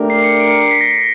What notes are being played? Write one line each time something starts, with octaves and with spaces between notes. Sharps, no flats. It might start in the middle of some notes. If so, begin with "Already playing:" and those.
Already playing: A3 D4 G4 A#4
C7
C#7
D7
C#7
C7
B6
A#6
A#6